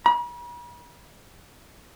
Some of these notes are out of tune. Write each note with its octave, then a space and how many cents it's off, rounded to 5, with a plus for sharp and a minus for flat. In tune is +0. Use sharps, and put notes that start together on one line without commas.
B5 -45